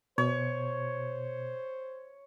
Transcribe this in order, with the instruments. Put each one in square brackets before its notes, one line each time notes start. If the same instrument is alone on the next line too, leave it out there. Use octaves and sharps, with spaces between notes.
[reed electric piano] B2 [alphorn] C5 [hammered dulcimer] C#5